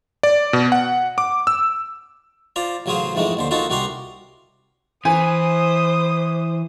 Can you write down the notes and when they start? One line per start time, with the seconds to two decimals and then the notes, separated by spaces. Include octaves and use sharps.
0.23 D5
0.53 B2
0.72 F#5
1.18 D6
1.47 E6
2.56 F4 C5 D5 A#5
2.86 A1 C#3 F#3 G#4 C5 F5
3.15 F2 G#2 E3 G#3 A3 D#4
3.37 D#2 D3 C5
3.51 D#4 F4 F#4 A4 A#4 C5
3.70 C2 F#4 G4 A#4 A#5 C6
5.05 E3 C5 G#5 D#6